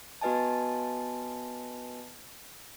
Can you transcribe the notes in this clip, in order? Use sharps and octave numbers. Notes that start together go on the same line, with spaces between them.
B3 F#4 B4 D#5 G#5 A5